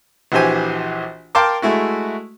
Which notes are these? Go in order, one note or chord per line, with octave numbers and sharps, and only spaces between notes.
A#1 E3 F#4 G4 C5 G#5
A#4 F5 G5 A5 C6 D6
G#3 A3 E4 F#4